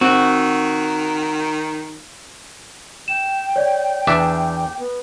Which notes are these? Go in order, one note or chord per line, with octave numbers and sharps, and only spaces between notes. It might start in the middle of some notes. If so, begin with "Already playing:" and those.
D#3 C4 F#4
G5 E7
C#5 D5
E2 D4 E5 D6
B3